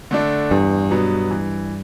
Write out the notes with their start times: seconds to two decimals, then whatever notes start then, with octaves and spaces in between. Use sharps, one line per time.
0.11 D3 A3 D4
0.51 E2 G2
0.91 B2 F#3 B3
1.31 E3